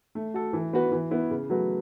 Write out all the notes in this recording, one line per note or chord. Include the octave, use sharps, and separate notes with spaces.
A3
F#4 A4
E3
B3 F#4 B4
E3
B3 E4
C#3
F#3 A3 F#4 B4